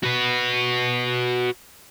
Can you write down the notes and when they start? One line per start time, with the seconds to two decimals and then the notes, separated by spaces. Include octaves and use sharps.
0.04 F#4 B4